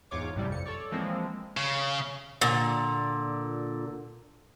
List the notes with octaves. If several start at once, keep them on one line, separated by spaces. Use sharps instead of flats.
E2 G#2 F4 C#5 D6
A1 F#2 A2 C3 G3
F2 C#7
A4 C#5 D5
E3 F3 G#3 A#3 C4
C#3
A#2 D3